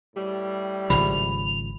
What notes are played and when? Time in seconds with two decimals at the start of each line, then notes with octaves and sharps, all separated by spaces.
0.16 A2 G3
0.90 G#1 C#3 F3 B5 F7